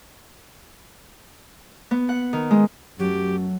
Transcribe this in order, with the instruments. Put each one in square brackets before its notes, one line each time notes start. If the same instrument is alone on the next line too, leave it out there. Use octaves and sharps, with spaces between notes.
[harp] B3
F#5
D#3
G#3
[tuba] F#2 [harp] F#3 A3 [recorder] G4